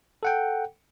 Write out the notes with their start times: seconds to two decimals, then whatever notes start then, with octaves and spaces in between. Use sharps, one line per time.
0.23 A4 F#5 G5